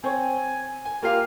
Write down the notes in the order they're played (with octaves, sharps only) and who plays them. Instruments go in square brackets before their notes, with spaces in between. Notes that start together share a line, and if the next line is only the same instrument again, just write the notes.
[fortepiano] C4 C#5 [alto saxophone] G#5
[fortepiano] G#5
[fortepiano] A#3 F4 F5 [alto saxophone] G4